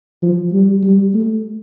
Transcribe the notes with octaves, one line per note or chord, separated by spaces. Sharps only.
F3
G3
G3
A3